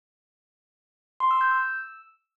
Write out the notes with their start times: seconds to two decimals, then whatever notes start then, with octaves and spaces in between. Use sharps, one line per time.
1.20 C6
1.31 E6
1.41 G6
1.51 E6